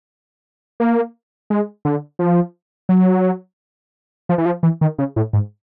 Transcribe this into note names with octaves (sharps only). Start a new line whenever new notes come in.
A#3
G#3
D3
F3
F#3
F3
E3
F3
E3
D#3
C#3
A2
G#2